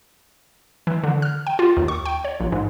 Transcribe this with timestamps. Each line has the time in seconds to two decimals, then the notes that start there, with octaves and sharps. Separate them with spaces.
0.87 E3
1.04 D3
1.22 F6
1.47 G5
1.59 F4
1.77 D#2
1.88 C#6
2.05 G5
2.24 C#5
2.40 A#1
2.52 G#2